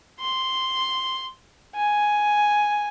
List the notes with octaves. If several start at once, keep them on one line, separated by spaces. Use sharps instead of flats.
C6
G#5